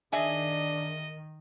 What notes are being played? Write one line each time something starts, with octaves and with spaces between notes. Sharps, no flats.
D#3 D4 G#4 D#5 E5 G#5